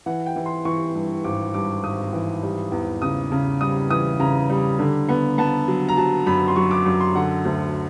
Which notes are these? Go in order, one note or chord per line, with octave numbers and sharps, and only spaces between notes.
E3 F#5
G5
E3
C6
E3 C#6
G2
G#1 D6
G2 D6
G#1 D#6
E3
G3
E2
C#3 D#6
C#3
G3 D#6
E3 D#6
C#3 A#5
G3
D3
B3
B3 A5
F#3
A#5
F#3 A5
F#2 B5
C6
F#3 C#6
D6
F#2
C6
D3 F#5
D2